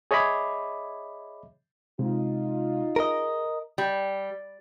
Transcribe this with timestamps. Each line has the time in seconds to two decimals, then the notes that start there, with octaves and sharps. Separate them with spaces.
0.11 G#4 C#5 D#5 E5 B5 D6
1.99 C3 G#3 D#4 F4
2.96 G#4 A#4 D#5
3.78 G3